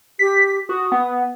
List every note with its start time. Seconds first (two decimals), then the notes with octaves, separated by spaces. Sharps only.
0.19 G4 B6
0.69 F#4 D#6
0.92 B3